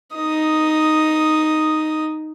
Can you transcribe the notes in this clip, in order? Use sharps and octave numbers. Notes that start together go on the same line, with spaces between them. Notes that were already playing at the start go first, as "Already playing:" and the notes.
D#4 D#6